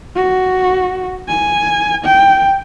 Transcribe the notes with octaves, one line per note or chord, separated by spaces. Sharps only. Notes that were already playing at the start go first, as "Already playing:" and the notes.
F#4
G#5
G5